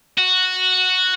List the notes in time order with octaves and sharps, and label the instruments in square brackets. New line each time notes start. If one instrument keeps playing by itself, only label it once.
[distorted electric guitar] F#4